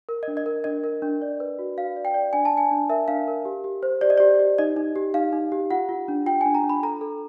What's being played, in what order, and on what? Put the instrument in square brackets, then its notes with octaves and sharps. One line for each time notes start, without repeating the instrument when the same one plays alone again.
[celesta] A#4
D4 D#5
D#5
A#4
D4 D#5
A#4
D4
D5
B4
F#4
F#4 F5
D5
G5
D5
D4 G#5
A5
D4 G#5
D4
A#4 E5
D4 F5
A#4
G4
G4
C5
G4 D5
D#5
G4 D5
G4
D#4 D#5
D#4
G4
D#4 F5
D#4
G4
F4 F#5
F4
D4
F4 G5
D4 G#5
A#5
D4
B5
A4 A#5
A4